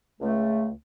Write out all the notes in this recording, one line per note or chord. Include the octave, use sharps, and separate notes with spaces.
C#2 A3